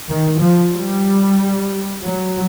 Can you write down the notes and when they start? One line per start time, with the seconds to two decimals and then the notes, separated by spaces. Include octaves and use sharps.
0.10 D#3
0.40 F3
0.74 G3
2.05 F#3